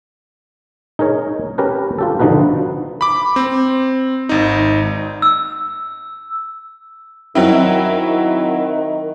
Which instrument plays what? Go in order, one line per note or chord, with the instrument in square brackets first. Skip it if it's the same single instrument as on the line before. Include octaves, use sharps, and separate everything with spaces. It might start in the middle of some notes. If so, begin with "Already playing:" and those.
[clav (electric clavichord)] D#4 G#4 A#4 C#5
C#4 G4 A#4 B4
F4 G4 A4
D3 D#3 F3 D#4 F#4 B4
[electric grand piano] B5 D6
C4
G#1 D#4
[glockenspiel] E6
[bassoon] D#3 [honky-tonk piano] F#3 C4 E4